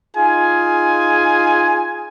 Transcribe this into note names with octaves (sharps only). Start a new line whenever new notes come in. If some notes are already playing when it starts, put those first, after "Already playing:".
D#4 F4 G#4 G#5